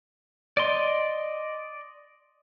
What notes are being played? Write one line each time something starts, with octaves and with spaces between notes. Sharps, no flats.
D5 D#5 C6